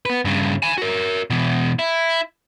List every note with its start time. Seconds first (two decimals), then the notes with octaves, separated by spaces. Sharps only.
0.06 B3 B4
0.25 G2 C#3
0.63 G#5 B5
0.78 F#4 A#4
1.30 B2 E3
1.79 E4